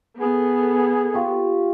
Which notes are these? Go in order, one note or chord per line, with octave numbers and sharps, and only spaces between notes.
B3 G#4 A4
F4 G4 C#6